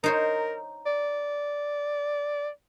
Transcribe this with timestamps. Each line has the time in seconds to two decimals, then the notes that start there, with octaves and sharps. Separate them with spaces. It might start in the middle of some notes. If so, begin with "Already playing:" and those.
0.04 D#4 A#4 C5 C#5
0.86 D5